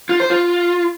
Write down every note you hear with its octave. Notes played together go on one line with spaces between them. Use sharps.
F4
C5
F4